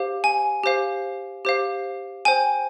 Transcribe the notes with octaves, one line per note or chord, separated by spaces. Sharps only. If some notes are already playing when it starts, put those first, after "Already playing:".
Already playing: G4 C5 F5
G#5
G4 C5 F5
G4 C5 F5
C5 G5 G#5